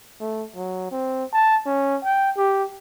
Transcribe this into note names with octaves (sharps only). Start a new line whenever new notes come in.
A3
F#3
C4
A5
C#4
G5
G4